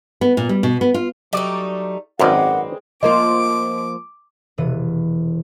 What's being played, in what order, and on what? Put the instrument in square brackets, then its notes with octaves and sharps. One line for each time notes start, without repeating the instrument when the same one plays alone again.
[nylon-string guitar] B3
A#2
G3
B2
B3
F4
[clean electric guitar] F#3 D5 [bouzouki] G3 A3 D#4
[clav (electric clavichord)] G#1 F#2 [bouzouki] G#3 C4 [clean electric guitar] A#4 B4 D5 [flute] F#5
[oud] F3 A#3 F4 [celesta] D#5 [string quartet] D6
[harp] E1 C3 E3 D#7